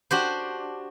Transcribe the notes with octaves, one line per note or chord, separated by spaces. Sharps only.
D4 F#4 G4 C5